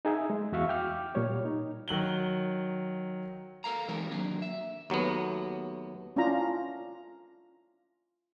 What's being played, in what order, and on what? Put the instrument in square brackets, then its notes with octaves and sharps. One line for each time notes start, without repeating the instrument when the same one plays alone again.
[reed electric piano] D#4 G#4 E5
G#3
E2 F#4 E5 F5 C#6
G5 D6 F6
A#2 G3 C#5
D#4
[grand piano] D#3 F#3 F#7 G7
[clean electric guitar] A4 A#4 F5 A#5
E3 G3 G#3 C4 D#4 A#4
D#3 F#3 A#3 D4
E5
[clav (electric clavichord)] D#2 F#3 A3 B3
[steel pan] C#4 D4 E4 F4 A#5